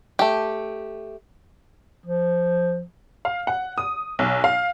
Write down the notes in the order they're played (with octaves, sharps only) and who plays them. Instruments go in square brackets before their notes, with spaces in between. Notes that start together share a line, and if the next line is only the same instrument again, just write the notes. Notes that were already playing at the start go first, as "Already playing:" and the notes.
[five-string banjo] A3 G4
[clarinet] F3
[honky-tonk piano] F5
F#5
D#6
B1
F5